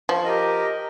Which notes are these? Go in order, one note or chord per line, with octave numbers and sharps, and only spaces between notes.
F3
G4 A#4 D#5